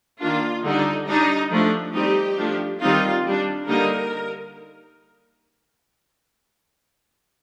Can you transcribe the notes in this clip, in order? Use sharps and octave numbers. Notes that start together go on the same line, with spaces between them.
D#3 A#3 D4 F4
D3 G3 D4 D#4
G3 D4 D#4
F3 A3 D4
G3 C4 D#4 G4
F3 A3 D4
D#3 G3 C4 D#4 F4
G3 D4
D3 G3 A#3 D#4 A#4